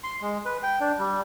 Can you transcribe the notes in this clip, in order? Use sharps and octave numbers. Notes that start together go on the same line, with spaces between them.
C6
G#3
B4
G5
D4
G3